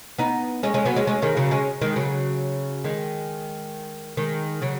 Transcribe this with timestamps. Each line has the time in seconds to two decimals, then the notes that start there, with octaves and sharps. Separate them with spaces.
0.18 B3 D#4
0.63 G#3 C#4
0.74 G#3 C#4
0.85 F#3 B3
0.96 G#3 C#4
1.07 G#3 C#4
1.22 D#3 G#3
1.37 C#3 F#3
1.51 G#3 C#4
1.81 D#3 G#3
1.96 C#3 F#3
2.84 D#3 G#3
4.17 D#3 G#3
4.62 C#3 F#3